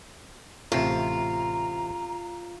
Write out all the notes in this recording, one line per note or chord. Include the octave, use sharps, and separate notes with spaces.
A1 C3 A3 F4 A#5